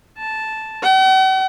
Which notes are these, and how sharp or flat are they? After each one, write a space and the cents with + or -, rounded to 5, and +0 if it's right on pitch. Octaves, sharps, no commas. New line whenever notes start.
A5 -5
F#5 +45